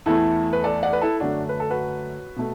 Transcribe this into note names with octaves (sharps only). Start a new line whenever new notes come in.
E2 E3 A3 E4 A4
B4
A4 D5
D5 F#5
B4
E4 A4
F#2 D3 A3 D4 F#4
B4
A4
F#4 B4
B2 A3